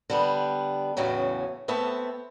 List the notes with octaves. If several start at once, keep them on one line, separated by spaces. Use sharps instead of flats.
D3 G3 B3
E2 A2 C#3 F#3 C#4
A3 B3 C4 E5 A5